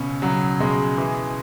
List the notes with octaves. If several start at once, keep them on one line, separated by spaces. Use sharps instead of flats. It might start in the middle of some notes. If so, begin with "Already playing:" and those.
Already playing: C#2 B2 C#4
C#2 F#3
B2 G#3
E3